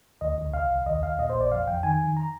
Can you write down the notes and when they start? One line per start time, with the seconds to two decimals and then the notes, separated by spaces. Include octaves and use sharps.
0.21 D2 D#5
0.38 D2
0.53 C2 F5
0.71 C2
0.86 D#2 D#5
1.02 D#2 F5
1.18 A#2 D#5
1.30 C5
1.34 A#1
1.41 D5
1.51 F2 F5
1.67 F2 G5
1.83 D#3 G#5
2.00 D#3
2.17 A#5